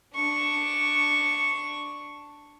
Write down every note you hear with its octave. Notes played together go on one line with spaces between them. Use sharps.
D4 C#6